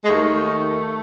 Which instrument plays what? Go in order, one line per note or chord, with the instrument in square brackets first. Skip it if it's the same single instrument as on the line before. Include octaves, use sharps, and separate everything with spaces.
[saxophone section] G#3
D#2 D#3 A3